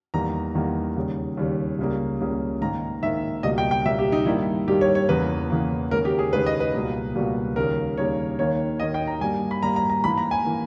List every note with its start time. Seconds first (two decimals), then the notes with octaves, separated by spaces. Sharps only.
0.14 E2 D#3 G3 A#3 A#5
0.55 E2 D#3 G3 A#3
0.96 D#2 C#3 G3
1.37 D#2 C#3 G3
1.79 C#2 C#3 G3 A#3
2.20 C#2 C#3 G3 A#3
2.61 G#2 D#3 A#3 A#5
3.03 G#2 D#3 A#3 E5
3.43 C#2 B2 G3 A#3 D#5
3.58 G5
3.71 G5
3.85 C#2 B2 G3 A#3 E5
3.99 G4
4.12 D#4
4.26 G2 D#3 G3 A#3 E4
4.68 G2 D#3 G3 A#3 G4
4.81 C#5
4.95 C#5
5.09 E2 C#3 E3 A#3 B4
5.50 E2 C#3 E3 A#3
5.91 D#2 C#3 G#3 A#4
6.05 G4
6.19 G#4
6.33 D#2 C#3 G#3 B4
6.46 D#5
6.60 B4
6.74 C#2 B2 G3 A#3
7.15 C#2 B2 G3 A#3
7.56 D#2 C#3 G3 A#3 A#4
7.97 D#2 C#3 G3 A#3 C#5
8.39 D#2 D#3 A#3 C#5
8.80 D#2 D#3 A#3 D#5
8.94 G5
9.07 A#5
9.21 G2 G3 A#3 G#5
9.51 B5
9.63 G2 G3 A#3 A#5
9.76 A#5
9.90 A#5
10.04 G#2 E3 A#3 B5
10.18 A#5
10.31 G#5
10.45 E3 A#3